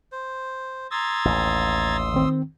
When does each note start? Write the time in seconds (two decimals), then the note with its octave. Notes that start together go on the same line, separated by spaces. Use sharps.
0.12 C5
0.91 A#5 C6 D#6 E6 G#6 A6
1.25 A1 D#2
2.14 D#3 C4